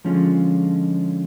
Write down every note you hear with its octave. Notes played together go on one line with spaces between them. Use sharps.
D3 F3 G#3 C#4 F4